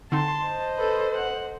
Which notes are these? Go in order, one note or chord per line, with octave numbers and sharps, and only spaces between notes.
D3 C4 D#4 A5 C6
C5 D#5
A4 B4
F#5